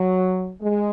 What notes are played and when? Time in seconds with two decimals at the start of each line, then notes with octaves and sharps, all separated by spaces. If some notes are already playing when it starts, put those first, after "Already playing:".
Already playing: F#3
0.60 G#3